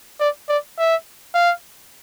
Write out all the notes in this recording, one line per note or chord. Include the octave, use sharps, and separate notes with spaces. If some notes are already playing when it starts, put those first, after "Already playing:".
D5
D5
E5
F5